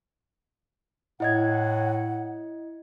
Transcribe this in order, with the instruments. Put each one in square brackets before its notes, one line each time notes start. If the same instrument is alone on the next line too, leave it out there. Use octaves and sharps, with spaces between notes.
[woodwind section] A2 F#5 [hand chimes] E4 D#5 G#6